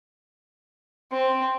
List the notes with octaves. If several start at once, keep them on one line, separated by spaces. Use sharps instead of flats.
C4